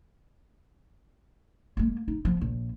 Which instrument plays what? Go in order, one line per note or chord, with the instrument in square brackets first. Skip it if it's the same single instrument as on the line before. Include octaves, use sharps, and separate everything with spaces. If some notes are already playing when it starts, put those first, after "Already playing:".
[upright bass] G#3 A#3
D#4
F3 B3
A#1